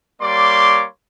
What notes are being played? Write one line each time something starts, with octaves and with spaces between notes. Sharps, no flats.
G3 A#3 C#5 D5 C6 D6